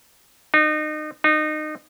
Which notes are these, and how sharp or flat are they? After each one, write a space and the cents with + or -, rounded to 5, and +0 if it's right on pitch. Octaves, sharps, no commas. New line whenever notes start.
D#4 -30
D#4 -25